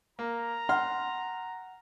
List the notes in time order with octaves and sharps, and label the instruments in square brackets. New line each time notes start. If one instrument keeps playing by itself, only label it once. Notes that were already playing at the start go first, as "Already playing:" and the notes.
[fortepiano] A#3 [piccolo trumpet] A#5
[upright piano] F#5 [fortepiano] C6 F6